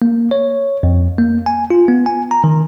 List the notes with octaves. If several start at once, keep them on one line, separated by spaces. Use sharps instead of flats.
A#3
C#5
F2
A#3
G#5
F4
B3
G#5
A#5
D#3